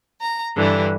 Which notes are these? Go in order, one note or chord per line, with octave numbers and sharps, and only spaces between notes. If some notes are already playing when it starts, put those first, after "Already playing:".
A#5
G2 D3 E3 G3